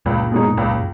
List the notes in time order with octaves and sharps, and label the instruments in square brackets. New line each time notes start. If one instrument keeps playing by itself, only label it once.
[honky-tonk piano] C#2 [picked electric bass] F#2 A#2
[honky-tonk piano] B2 G#3 D#4
C#2